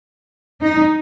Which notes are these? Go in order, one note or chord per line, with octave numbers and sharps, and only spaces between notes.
D#4